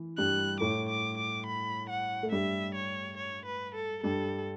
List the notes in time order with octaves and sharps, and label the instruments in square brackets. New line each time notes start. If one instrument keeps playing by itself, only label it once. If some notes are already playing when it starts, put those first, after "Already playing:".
Already playing: [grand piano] E3
[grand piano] G2 G3 [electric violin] F#6
[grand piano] A2 A3 [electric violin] D6
[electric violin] D6
D6
B5
F#5
[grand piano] A3
[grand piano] G2 G3 [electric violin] E5
[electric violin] C#5
C#5
B4
A4
[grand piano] G2 G3 [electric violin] A4